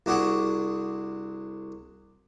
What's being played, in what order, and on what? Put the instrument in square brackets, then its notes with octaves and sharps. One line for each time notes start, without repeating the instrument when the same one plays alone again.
[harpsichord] C2 D4 F#4 G#4 F#5 D6